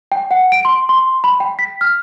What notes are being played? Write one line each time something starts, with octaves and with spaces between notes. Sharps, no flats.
G5
F#5
D7
C6
C6
B5
G5
B6
F6